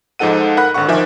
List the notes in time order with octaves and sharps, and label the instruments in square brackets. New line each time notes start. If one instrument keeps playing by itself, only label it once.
[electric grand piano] G#2 F3 D#4 A4 F#5 D#7
A#4 F#5 B5 F#6
G#1 D3 F#5 C#6
D#3 F3 A#4 E5 G#5 D6